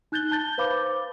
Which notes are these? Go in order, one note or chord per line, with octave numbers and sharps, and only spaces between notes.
D#4 F#6 G6 A6 G7
A5 G6 A6 G7
B4 C5 F5 B5 D6